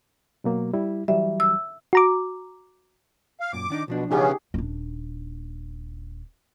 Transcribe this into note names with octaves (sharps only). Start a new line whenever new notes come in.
B2 F#3 A#3
G3 E4
E3 F#3 G3 E5
E6
F#4 A#5 D6
F5
F#2 A#2 D6
D#3 D4 D#4
B1 B2 F3 D4
C#3 B3 C#4 D#4 G4 G#4
D#1 D4